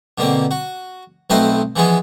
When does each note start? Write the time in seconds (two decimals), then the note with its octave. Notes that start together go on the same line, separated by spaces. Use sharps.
0.18 B2 D3 A#3 C4
0.51 F#4
1.30 B1 A3 C4 B4 C5 D#5
1.76 E3 F3 G#3 B3 G#4